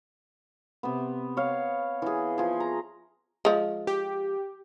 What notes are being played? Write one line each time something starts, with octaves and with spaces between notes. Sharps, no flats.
C3 B3
C#5 F5
E3 G#4
F3 G#4
A#5
F3 G#3
G4